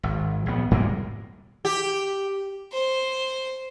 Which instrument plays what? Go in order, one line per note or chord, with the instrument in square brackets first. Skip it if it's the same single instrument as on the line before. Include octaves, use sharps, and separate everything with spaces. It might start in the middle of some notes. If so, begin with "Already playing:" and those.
[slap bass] G#1
A#1 B3
G#2 G3 G#3 A#3
[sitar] G4
[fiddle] C5